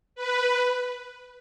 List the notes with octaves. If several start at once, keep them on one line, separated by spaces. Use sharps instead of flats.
B4